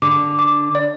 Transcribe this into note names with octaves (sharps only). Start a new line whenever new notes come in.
D3 D6
D6
D5